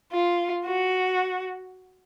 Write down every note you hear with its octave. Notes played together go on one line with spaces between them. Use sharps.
F4
F#4